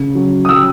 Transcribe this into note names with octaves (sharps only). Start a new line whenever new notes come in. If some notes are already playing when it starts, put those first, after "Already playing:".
Already playing: C#3
F#3
D#6
F#3 E6